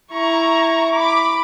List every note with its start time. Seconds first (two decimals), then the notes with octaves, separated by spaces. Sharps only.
0.13 E4 A#5 C#6
0.96 B5 D6